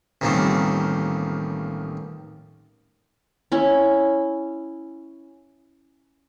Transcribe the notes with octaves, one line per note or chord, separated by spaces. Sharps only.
A1 D#2 D#3 F3 G3 C4
C#4 E4